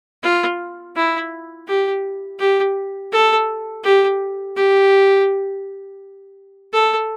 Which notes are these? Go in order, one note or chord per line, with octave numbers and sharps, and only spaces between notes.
F4
E4
G4
G4
A4
G4
G4
A4